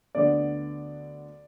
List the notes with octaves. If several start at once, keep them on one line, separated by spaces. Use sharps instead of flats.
D2 D3 B3 D5